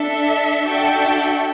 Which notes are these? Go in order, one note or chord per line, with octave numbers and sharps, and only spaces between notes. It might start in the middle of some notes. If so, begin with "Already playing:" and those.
Already playing: D4 A4 E5
D4 F#4 A4 E5 G5